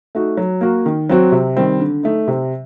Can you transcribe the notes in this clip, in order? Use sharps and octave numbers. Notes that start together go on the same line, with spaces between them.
A3 D#4 F#4
F#3
A#3 F#4
D#3
F#3 C4 F#4
C3
D#3 G3 C4
D3
A3 D#4
C3